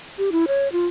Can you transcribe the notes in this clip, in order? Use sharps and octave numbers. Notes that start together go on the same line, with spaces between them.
G4
E4
C#5
F4